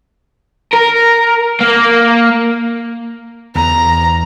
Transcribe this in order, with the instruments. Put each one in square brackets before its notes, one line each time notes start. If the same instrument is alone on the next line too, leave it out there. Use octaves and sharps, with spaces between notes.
[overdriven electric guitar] A#4
A#3
[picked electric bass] E2 [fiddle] A#5